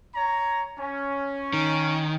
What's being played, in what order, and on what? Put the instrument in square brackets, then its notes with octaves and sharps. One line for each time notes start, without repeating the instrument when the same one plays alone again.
[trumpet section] C#5 A#5
C#4
[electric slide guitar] D#3